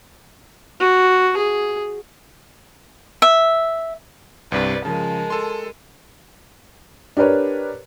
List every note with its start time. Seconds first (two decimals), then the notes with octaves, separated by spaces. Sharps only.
0.80 F#4
1.37 G#4
3.22 E5
4.52 C2 G2 C3 B4 D5
4.85 C#3 F3 G#3 A#4 A5
5.30 A4 C6
7.17 D4 G4 A#4 B4 C#5